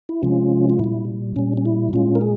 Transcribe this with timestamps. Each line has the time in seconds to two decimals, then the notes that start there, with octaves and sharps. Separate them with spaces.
0.09 E4
0.23 C3 F3 G#3 C#4 F4
0.70 F4
0.79 A#2 G3 E4
1.36 A#2 G3 C#4
1.57 C#4
1.65 E4
1.93 A#2 G#3 C#4 F4
2.15 A#4
2.21 G#4